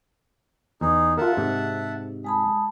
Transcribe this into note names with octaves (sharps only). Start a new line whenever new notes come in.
E2 D#4 G#4
F4 A#4 E5 F#5 A5
G#2 C3
G#3 G#4 A5 B5